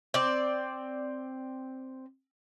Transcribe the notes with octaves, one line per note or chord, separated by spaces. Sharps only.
C4 D5